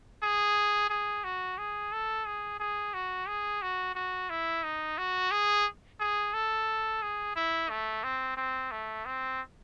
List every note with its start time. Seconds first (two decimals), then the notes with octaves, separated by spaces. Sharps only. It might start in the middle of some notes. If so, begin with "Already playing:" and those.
0.23 G#4
0.90 G#4
1.24 F#4
1.58 G#4
1.92 A4
2.26 G#4
2.60 G#4
2.94 F#4
3.28 G#4
3.62 F#4
3.95 F#4
4.30 E4
4.63 D#4
4.98 F#4
5.31 G#4
6.00 G#4
6.33 A4
7.02 G#4
7.36 E4
7.70 A3
8.04 C4
8.37 C4
8.71 A3
9.06 C4